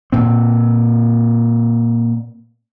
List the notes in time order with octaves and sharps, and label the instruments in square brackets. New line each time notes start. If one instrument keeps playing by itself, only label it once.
[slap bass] A#2 C4